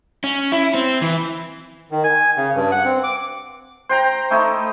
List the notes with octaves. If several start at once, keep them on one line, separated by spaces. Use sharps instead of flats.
C#4
E4
C4
E3
D#3
G#5
C#3
G2
F#5
C4
D6
C5 G5 A#5
A3 D#4 E4